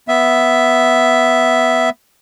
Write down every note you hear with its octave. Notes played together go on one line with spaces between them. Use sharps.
B3 E5